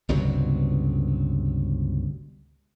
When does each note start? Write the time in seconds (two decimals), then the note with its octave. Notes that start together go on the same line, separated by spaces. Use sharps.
0.09 G1 C#2 C3 F#3